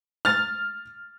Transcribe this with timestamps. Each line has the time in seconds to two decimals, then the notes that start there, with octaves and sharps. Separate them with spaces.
0.25 F6 A6